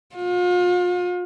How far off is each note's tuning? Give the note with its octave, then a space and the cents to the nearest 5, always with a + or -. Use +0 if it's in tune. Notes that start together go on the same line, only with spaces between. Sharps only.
F4 +40